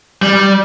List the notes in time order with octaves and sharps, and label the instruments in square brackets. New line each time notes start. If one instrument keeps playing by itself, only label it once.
[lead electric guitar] G3